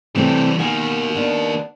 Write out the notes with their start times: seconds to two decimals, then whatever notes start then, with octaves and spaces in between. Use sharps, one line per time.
0.15 C3 E3 G3 A3 C4
0.59 B2 D#3 A#3 F#4 G#5
1.15 B3 D4